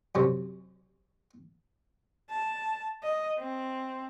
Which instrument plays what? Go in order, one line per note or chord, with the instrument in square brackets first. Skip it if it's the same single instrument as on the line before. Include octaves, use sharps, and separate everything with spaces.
[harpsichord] F#2 C3 C#4
[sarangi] A5
D#5
C4